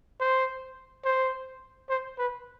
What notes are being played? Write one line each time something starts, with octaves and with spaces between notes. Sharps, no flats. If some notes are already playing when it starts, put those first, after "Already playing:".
C5
C5
C5
B4